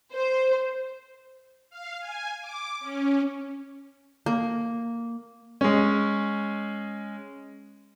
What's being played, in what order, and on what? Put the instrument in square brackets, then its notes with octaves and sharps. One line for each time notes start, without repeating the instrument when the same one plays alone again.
[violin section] C5
[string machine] F5
G#5
D6
C#4
[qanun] A#3
[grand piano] G#3 C#4